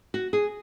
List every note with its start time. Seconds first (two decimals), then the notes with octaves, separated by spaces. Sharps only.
0.14 F#4
0.33 G#4